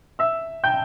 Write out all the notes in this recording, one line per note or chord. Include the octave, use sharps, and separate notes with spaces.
E5 E6
G5 G6